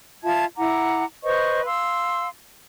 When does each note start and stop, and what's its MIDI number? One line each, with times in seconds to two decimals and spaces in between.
0.23 0.44 65
0.23 0.44 76
0.23 0.44 81
0.23 0.44 92
0.57 1.04 64
0.57 1.04 78
0.57 1.04 82
0.57 1.04 86
1.24 1.65 71
1.24 1.65 72
1.24 1.65 75
1.24 1.65 85
1.65 2.28 77
1.65 2.28 84
1.65 2.28 88